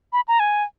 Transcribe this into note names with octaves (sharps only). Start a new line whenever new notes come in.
B5
A#5
G#5